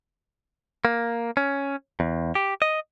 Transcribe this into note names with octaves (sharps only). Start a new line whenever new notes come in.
A#3
C#4
E2
G4
D#5